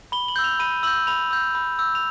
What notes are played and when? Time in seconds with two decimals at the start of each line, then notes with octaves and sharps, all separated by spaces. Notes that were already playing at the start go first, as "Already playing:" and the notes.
0.12 B5 G7
0.28 F#7
0.36 E6 G6
0.44 F7
0.59 B5 D#7
0.83 E6 G6 F#7
1.07 B5 F7
1.31 E6 G6
1.55 B5
1.79 E6 G6
1.95 F7